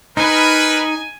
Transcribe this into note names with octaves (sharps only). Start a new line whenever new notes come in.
D#4 A#4 B4 G#5